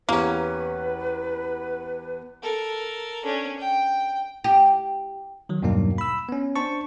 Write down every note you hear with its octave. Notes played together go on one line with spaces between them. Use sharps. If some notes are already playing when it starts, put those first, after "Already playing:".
E2 A#3 C#4 G4 B4 A#5
A4 A#4
C#4 D4
G5
G4
D#3 F#3
E2 G2 B2 F#3 A#3 D#4
B5 E6
B3 C#4
D4 C5 A5 C#6